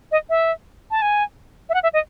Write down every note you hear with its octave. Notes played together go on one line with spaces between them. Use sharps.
D#5
E5
A5
G#5
E5
F#5
E5
D#5